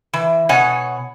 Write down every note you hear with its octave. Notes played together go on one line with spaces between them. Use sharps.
E3
B2 C#5 F#5 G#5